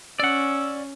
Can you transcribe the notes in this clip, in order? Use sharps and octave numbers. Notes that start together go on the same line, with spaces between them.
C#4 D5 F#5 E6